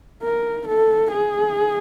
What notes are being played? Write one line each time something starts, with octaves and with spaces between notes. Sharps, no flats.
A#4
A4
G#4